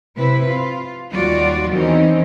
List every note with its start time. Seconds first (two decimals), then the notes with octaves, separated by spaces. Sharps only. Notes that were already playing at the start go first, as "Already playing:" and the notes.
0.17 C3 E4 B4
0.48 F4
1.12 D#2 G3 F4 F#4 D5
1.73 E2 D#3 E3 C4 C#4 D#4